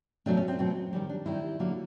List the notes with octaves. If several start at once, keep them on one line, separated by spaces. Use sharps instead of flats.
B2 F#3 A3 C4 D4
C#4
C4
B2 F#3 A3 C4
D#3 G3 C4 C#4
D4
D#3 G3 C4 E4
D3 F#3 A#3